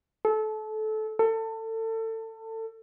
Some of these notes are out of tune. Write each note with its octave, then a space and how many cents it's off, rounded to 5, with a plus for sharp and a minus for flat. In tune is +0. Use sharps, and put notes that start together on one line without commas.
A4 -25
A4 +25